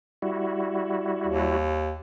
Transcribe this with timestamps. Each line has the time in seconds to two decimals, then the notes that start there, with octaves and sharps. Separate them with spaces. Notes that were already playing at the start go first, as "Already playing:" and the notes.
0.22 G3 E4 F#4
1.27 D#2